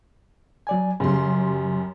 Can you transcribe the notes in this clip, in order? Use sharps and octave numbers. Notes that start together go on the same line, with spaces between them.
F#3 D5 G#5
F#2 C#3 G3 C6